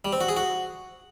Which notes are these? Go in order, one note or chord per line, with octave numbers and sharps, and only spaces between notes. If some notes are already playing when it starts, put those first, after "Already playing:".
G3
C4
F#4
G#4
F#4